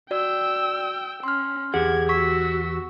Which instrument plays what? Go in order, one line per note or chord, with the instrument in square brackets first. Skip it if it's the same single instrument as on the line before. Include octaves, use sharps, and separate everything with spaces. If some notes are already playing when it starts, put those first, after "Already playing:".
[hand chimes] F#4 D5 [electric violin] G5 E6
[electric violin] C#4 [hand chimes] C6 F6
[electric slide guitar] E2 G4 F#5 [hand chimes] G#4 [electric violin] G#6
[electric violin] F#4 E6 [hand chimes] C#6 B6